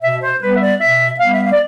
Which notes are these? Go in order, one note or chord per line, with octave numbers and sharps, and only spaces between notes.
B2 E5
C5
G3 B3 B4
E5
D5
B2 E5
G3 B3 F5
E5
F5
D5